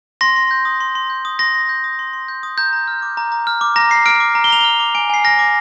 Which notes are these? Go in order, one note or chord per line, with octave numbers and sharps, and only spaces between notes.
C6 A#6
C6
G6
D#6
C6
C6
G6
D#6
C6 A#6
C6
G6
D#6
C6
C6
G6
D#6
A#5 G6
A#5
F6
D6
A#5
A#5
F6
D6
A#5 A#6
A#5 C7
F6 D7
D6
A#5
G7
A#5 F7
F6 G7
D6
G#5 D7
G#5 C7
F6 A#6
D6